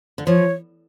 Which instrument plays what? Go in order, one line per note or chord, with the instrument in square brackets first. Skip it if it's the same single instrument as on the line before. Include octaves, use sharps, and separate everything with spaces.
[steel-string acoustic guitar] D3
[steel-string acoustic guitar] F3 [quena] C#5